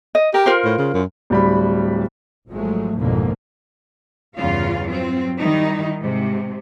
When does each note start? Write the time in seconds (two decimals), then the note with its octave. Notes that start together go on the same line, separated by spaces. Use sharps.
0.15 D#5
0.34 G4 A#4
0.46 F4 A#4 C5
0.64 A2
0.79 C#3
0.94 F#2
1.30 D1 G3 B5
2.48 G#1 G#2 F3 F#3 G#3 A3
2.96 A1 F2 G#2 B2 D3 A#3
4.36 E2 G2 C#3 F4 F5
4.89 F#3 C4 F4
5.39 D#3 G3 D#4 E4
6.01 G#2 C3